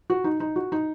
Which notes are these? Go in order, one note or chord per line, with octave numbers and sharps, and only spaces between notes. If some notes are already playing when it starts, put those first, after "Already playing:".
F#4
D#4
D#4
F#4
D#4